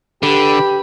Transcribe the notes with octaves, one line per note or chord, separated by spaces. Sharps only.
D3 G4 B4 B5